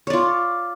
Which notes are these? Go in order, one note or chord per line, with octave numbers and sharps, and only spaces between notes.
F4 C#5 D5